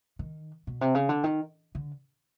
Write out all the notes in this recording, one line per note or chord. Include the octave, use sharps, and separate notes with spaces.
D#3
B2
C3
C#3
D3
D#3
D3